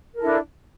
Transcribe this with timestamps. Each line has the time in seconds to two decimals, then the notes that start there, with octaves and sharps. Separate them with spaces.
0.15 A#4
0.18 A4
0.20 E4
0.23 D4